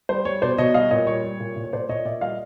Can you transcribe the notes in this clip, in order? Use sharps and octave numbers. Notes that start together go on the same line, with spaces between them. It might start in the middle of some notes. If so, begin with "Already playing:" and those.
G3 C5
G3 C#5
B2 C5 D5
B2 C#5 D#5
G3 D#5 F5
A#2 C#5 D#5
G3 C#5
G3
A#2
A#2
C#5
A#2 C5 D5
A#2 C#5 D#5
A#2 D5 E5
G3 D#5 F5